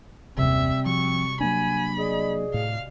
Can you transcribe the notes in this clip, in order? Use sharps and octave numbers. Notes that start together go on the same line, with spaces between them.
F#1 D#2 C3 G3 C4 E5
F3 F#4 C#6
F#3 A#3 D4 G#5 B5
G#4 D5 D#5 G#5
A2 F5